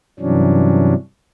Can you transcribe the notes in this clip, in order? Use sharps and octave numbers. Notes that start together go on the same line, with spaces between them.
G2 C3 E3 F#3 C#4 D4